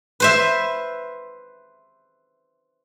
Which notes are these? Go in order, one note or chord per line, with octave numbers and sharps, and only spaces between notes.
B4 C5 E5